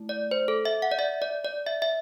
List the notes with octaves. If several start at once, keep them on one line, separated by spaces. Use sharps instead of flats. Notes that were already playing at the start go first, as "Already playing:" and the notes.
Already playing: A3 E4
D5
C5
A4
E5
F#5
D5
E5
D5
D5
E5
E5